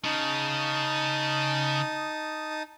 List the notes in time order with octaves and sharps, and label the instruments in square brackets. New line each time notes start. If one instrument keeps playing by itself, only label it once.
[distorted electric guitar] C#3 [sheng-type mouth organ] D#4 A5 D#6